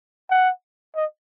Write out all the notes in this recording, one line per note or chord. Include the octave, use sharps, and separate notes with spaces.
F#5
D#5